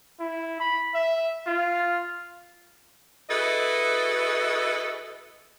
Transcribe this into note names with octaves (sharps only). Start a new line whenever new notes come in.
E4
B5
E5
F4
E4 F#4 G#4 A4 B4 D#5